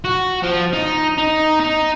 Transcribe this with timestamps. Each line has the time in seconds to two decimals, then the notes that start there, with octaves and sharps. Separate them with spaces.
0.04 F#4
0.43 F3
0.73 D#4
1.18 D#4
1.60 D#4